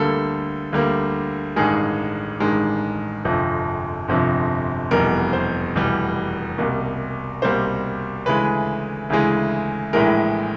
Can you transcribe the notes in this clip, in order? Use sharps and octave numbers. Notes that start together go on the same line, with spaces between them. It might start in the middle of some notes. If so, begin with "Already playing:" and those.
Already playing: D2 D3 G3 A#3 A4
D2 D3 G3 A#3
A1 G2 D#3 G#3 G#4
A1 G2 D#3 G#3
G1 F2 C3 F3
G1 F2 C3 F3
F1 E2 B2 G3 A#4
C5
F1 E2 B2 G3
C2 B2 G3 A#3
C2 B2 G3 A#3 C5
D2 C#3 E3 G#3 B4
D2 C#3 E3 G#3
A#1 A2 E3 G#3 A#4